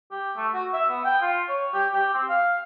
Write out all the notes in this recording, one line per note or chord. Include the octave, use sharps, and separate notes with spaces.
G4
A3
F#4
E5
B3
G5
F4
C#5
G4
G4
C4
F5